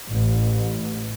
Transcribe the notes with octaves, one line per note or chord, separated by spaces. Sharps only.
A1